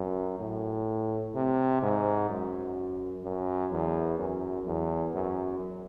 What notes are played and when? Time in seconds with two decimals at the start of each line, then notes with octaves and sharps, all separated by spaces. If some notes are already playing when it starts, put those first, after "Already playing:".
Already playing: F#2
0.40 A2
1.35 C3
1.82 G#2
2.30 F#2
3.24 F#2
3.72 E2
4.19 F#2
4.66 E2
5.14 F#2